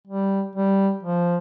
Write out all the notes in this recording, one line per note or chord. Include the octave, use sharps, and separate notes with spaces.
G3
G3
F3